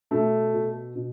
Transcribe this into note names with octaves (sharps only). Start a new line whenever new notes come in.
B2 A3
B2
B2